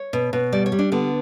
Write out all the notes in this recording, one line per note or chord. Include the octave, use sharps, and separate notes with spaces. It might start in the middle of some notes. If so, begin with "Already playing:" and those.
Already playing: C#5
B2
B2
G3 D5
C#5
G3
D4
D3 B3